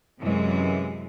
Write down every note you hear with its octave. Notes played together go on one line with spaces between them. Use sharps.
F#2 C3 E3 G#3